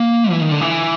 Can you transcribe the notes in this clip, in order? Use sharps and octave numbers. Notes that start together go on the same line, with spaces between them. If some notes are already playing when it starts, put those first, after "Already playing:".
Already playing: A#3
E3
D#3
D3
E3